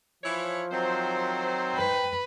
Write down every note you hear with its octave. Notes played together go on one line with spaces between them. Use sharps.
E3 F3 E4 C#5
D#3 F#3 C4 C5
B4 G5